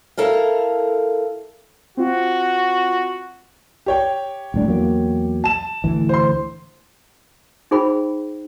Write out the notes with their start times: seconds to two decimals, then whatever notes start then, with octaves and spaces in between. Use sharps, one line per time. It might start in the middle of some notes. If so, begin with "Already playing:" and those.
0.17 E4 A4 A#4 F5
1.97 C4 F4 F#4
3.86 G4 C#5 G5
4.54 D#1 A2 D4
4.66 E2 F#3 A#3
5.44 A5 E7
5.84 D2 A2 E3
6.09 C5 C6
7.71 D#4 G#4 C5 G5 B5